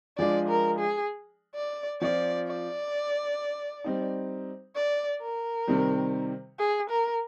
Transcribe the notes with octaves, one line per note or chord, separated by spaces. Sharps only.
F3 G#3 D4 F4 D5
A#4
G#4
D5
F3 C4 F4 D5
D5
G3 C4 D#4
D5
A#4
C3 D#3 G3 C4
G#4
A#4